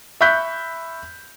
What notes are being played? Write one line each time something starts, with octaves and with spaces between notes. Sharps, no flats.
E5 B5 C#6 F#6 G6 B6